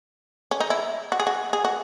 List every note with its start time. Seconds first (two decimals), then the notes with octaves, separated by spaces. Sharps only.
0.51 C#4
0.60 D#4
0.70 E4
1.12 F#4
1.20 G#4
1.27 F#4
1.53 G#4
1.65 F#4